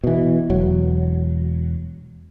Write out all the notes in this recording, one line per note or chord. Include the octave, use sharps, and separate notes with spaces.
B2 E3
E1 F#3